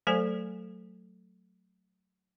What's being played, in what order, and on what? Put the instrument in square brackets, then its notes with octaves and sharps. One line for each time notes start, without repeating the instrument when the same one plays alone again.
[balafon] F#3 A3 A4 C5 G#5